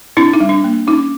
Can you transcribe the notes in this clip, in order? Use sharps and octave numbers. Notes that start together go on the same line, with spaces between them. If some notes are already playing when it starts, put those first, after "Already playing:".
C4 D4 E4
D#4
G3
D4
A#3
C#4 D#4